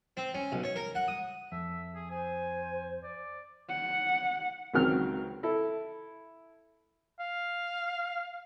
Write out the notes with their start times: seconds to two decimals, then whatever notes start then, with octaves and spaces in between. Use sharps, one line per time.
0.17 C4
0.34 C#4
0.52 B1
0.64 C#5
0.76 A#4
0.95 F#5
1.08 D#6
1.52 F2 E5
1.95 G#4
2.11 C5 G#5
3.03 D5
3.70 F#5
4.73 C#2 D#3 F#3 C4 F6
5.43 E4 A4
7.20 F5